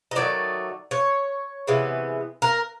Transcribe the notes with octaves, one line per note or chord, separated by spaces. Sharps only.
D#5
D#3 F#3 A3 D5
C#5
C3 E3 G#3 B3
A#4